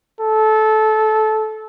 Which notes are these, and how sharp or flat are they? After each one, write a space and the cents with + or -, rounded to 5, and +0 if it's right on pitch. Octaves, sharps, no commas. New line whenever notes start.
A4 -20